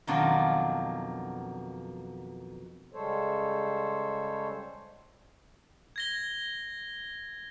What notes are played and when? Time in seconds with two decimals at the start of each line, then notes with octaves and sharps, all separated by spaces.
0.07 F2 B2 D#3 F#3 D4 F4
2.93 C#3 G3 G#3 A4 C5 C#5
5.96 G#6 A#6 G7